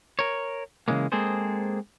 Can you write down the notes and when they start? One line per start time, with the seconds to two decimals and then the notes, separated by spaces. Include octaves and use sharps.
0.19 A#4 C#5
0.88 C#3 E3 G#3 A#3
1.12 G#3 A#3 C4 G#4 A4 C5